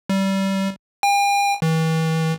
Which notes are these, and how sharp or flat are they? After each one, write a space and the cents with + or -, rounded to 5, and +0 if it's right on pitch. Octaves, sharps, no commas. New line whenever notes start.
G3 -20
G5 +45
E3 -40